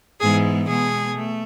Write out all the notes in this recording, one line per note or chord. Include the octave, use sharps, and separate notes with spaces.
G#2 E3 G#3 B3 G#4
B2 G#3 B3 G#4
A3